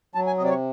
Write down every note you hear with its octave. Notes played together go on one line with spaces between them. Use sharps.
F#3 A5
G#5
C3 D#5
D5
C#5